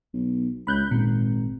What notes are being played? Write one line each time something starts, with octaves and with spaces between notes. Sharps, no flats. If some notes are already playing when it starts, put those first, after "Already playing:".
B1
C#2 B5 F#6 G6
G#1 A#2